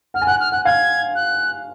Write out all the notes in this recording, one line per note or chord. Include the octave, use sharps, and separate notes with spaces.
F#5 F6
G#5
F#5 F#6
F6
F#5 F#6
F5 G#6
F#6